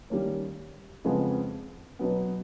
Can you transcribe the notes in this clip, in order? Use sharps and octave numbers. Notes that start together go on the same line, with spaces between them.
D#3 G3 A#3 C#4
F2 C#3 F3 G#3 B3
B2 F#3 B3